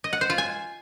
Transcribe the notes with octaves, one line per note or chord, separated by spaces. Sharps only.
D#5
F#5
C5
F4
G#5